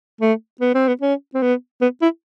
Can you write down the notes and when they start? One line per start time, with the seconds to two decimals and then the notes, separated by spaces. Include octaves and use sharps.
0.21 A3
0.61 B3
0.74 C4
0.88 B3
1.01 C#4
1.34 C4
1.42 B3
1.81 B3
2.02 E4